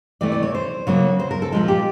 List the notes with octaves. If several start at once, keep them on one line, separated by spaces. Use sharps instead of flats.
C3 E3 A3 D5
D5
C#5
C5
C#3 F#3 A#3 C#5
C5
A#4
A4
A#2 F3 G#3 F4
G4